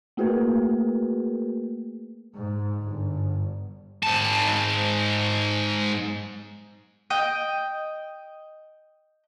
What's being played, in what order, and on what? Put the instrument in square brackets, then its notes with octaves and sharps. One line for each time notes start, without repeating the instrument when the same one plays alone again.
[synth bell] A3 A#3 F#4 G#4 A#4 B4
[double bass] G#2
G1
[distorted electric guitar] G#2 A5
[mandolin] D#5 G5